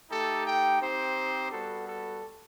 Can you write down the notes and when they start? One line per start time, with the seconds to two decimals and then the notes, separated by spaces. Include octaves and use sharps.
0.10 A3 D#4 G4 A4
0.46 G5
0.80 C4 D#4 G4 C5
1.52 G3 B3 F#4 A4
1.87 A4